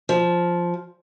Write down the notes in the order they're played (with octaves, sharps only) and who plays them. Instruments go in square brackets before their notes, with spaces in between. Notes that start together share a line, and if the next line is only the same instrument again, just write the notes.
[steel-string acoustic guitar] F3